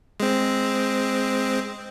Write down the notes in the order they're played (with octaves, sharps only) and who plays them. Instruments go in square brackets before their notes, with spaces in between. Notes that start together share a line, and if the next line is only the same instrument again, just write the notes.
[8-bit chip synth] G#3 C4